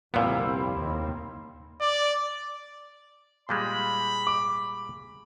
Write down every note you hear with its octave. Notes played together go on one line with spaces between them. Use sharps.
C2 F2 A#2 D3 G3 B3 C4 E4
D#2 D#3 A#3
D5
A#2 G3 G#3 B5
D6